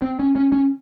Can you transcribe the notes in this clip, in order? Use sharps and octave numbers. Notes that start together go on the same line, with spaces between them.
C4
C#4
C#4
C#4